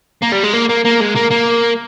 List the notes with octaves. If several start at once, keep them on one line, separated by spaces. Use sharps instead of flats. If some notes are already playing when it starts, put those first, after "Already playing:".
A#3
G3
G#3
A#3
A#3
A#3
G#3
A#3
A#3